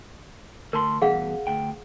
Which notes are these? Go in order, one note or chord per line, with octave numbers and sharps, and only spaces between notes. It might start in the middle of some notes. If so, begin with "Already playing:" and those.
D2 A#4 A5 C6
E2 G2 B2 G#4 F5 F#5
D2 G5